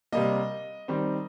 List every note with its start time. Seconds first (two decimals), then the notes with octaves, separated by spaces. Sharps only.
0.12 C3 G3 A#3 D#5
0.88 D#3 G3 C4